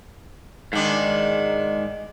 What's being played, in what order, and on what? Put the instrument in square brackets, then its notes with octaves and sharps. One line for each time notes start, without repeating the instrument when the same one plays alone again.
[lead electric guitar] G#2 G#3 [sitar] D#3 D4